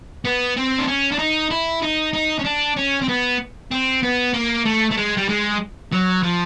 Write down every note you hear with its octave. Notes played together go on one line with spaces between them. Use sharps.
B3
C4
D4
C#4
D4
D#4
E4
D#4
D#4
C#4
D4
C#4
C4
B3
C4
B3
A#3
A3
A3
G#3
G3
G#3
F#3
F3